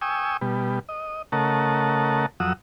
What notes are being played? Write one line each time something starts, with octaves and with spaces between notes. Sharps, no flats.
G5 G#5 C#6 D#6 E6
B2 G3
D#5
C#3 A3 A#4 D#5 F#5 A5
F2 F#3 F#5 D#6 E6